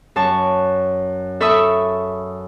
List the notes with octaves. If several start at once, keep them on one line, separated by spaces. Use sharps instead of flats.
F#2 A5 C#6
A4 E5 B5 C#6 D#6 E6